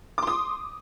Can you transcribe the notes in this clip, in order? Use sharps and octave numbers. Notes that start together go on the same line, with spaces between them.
C6 D6 D#6